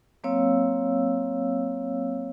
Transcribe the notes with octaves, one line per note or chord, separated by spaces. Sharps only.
F#3 A#3 C4 C#5 F5 E6